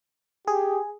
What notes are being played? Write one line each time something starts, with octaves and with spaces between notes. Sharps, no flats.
G4 G#4